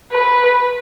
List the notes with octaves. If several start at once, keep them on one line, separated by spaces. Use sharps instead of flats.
B4